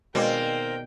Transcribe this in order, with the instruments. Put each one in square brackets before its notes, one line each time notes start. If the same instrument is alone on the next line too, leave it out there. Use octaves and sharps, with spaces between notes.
[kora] B2 G#3 D5 [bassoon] D#3 [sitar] A#3 C4 [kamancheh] G5